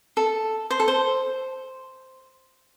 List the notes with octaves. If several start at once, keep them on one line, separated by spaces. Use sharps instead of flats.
A4
C5
A4
C5